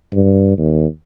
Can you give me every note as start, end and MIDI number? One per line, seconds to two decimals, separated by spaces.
0.13 0.56 43
0.58 0.86 39